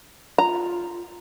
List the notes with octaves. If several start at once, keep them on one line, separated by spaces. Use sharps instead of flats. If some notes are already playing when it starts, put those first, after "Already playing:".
F4 A#5